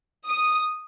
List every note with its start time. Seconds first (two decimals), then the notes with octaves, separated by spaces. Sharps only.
0.25 D#6